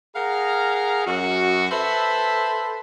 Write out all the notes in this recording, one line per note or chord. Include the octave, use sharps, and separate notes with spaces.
G#4 A#4 F5 F#5 A#5
F#2 F#4
A4 B4 C5 E5 A5 B5